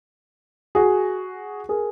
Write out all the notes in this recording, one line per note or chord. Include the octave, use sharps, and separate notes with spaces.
F#4 G#4
G#4 A#4